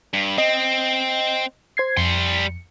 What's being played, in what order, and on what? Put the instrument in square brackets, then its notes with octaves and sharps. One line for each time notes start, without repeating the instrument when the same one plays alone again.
[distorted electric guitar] G2
[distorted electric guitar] C4 [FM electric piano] D#5
[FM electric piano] C5 G#6 C7
[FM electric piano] F2 C#7 [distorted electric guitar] G3 C6